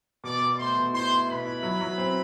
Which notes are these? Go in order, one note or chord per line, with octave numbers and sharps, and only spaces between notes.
B2 D5 D6
B2
A3 C5 C6
B2
E4 C5 C6
E4
B2 B4 B5
E4
F#3
F#3
C4